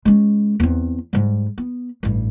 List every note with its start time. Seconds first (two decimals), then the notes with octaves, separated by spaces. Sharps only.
0.05 G#3 C#4
0.60 E2 C4
1.13 G#2 G3
1.58 B3
2.03 A1 G2